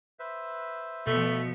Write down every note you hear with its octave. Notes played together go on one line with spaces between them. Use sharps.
B4 C5 E5
B2 F3 A3 B3